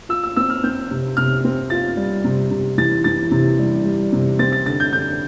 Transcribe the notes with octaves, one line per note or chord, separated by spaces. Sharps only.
F4 E6
E6
C4 E6
F6
C4 G6
C3
C3 F6
C4
F4 A6
G3
C3
C3
E3 A6
E3 A6
C3
G3
G3
C3
C4 A6
A6
D3 A6
G6
D3 G6